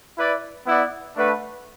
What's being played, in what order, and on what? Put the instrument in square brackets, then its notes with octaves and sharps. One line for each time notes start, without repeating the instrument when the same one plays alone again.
[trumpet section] E4 B4 D5
B3 E4 D5 F#5
A3 D4 B4 F#5